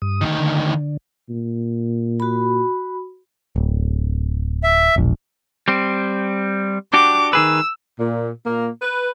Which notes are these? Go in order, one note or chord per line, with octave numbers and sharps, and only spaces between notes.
G2 D#6
D2 D#3
D3
A#2
F#4 B5
D1
E5
E1 A#1
G3 C4
D4 F#4 G4 D6
D#3 G#4 B4 E6
A#2
A#2 A#3
B4